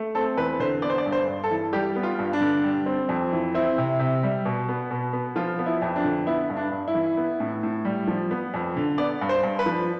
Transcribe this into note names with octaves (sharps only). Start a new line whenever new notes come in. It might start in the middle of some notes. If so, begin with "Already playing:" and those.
Already playing: A3
C4 A4
E2 B4
D3 C5
B3 D5
C5
D5
G2
C5
G2
A4
E3
G3 G4
B3
F4
G2
D4
D3
G3
C4
F2
E3
C4 E4
C3
C3
G3
B2
B3
B2
B3
F3 F4
B3
E4
F2
D4
D3
B3 E4
G2
D4
G2
E4
E3
B3
A2
A2
G3
F3
B3
F2
D3
B3 D5
G2
C5
G2
B4
F3